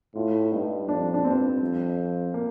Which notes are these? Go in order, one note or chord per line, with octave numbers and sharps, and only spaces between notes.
A2 F4
G2 D#4
F2 D4
D4
G2 C4
F2
A#3